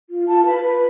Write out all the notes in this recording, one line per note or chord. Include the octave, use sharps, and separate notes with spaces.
F4
F4 A5
B4 B5
B4 B5